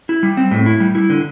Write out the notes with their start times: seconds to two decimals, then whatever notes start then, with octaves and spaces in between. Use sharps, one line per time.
0.09 E4
0.23 G3
0.37 C4
0.51 A2
0.66 E4
0.80 G3
0.95 E4
1.10 D3